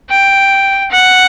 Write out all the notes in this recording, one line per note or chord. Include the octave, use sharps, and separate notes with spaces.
G5
F#5